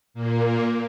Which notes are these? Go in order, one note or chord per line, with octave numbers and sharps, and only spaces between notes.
A#2 A#3